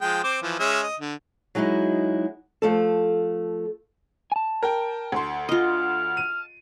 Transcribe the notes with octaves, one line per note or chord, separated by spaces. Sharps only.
F3 G#3 G5
C4 C5 D6
E3 F3
G#3 C#4 E5
D#5
D3
F#3 G#3 D#4 E4 F#4
F3 A3 A4
G#5 A5
A#4 G5
D2 C6
F4 D#5 F6
D#7